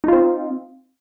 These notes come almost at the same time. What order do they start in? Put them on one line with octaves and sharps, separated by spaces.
D#4 F4 C4